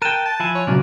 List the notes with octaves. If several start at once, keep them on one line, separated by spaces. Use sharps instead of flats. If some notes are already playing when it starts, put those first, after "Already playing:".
A#4 G5 A5 F#6 D#7 E7
A5
F3 E4 G#5
C#5
A#2 C#3 F#3 F4 D5